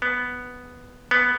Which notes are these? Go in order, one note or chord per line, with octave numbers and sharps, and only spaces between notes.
B3
B3